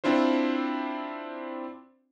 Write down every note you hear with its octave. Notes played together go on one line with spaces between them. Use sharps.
C4 D4 E4 F4 C5